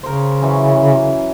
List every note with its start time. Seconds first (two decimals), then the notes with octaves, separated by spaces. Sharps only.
0.03 C#3 A#4 C5
0.42 E3 F#3 C#4